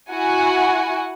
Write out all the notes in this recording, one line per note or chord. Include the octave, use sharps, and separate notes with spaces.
E4 F#4 F#5 G#5